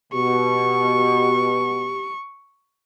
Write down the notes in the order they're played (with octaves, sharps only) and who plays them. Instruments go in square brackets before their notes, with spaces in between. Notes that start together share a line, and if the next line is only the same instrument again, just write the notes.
[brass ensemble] B2 [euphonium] G4 [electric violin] C#6